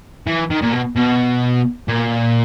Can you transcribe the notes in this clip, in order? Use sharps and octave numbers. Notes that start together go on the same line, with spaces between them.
E3
D#3
A#2
B2
B2
A#2